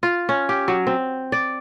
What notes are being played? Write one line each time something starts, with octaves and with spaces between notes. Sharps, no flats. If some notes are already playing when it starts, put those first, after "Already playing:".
F4
C#4
G4
F#3
C4
D5